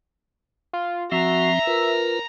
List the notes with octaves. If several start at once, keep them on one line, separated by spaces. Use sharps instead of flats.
F4
F3 C4 F#4 E5 A#5
F4 A#4 B4